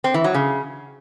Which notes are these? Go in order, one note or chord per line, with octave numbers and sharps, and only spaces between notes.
C4
E3
F#3
C#3